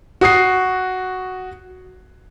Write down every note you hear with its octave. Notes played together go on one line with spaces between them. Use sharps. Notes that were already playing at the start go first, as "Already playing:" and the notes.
F#4 D#6 C7